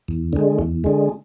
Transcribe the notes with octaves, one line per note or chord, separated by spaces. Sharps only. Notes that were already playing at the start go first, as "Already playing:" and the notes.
E2
D3 G#3
E2
D3 G#3